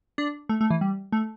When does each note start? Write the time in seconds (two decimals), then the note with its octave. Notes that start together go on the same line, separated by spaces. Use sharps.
0.18 D4
0.49 A3
0.61 A3
0.70 E3
0.81 G3
1.12 A3